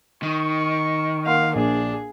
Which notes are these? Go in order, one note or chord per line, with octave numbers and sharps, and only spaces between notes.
D#3 C#6
A#3 F5 F#5 C6
A#1 D4 G#4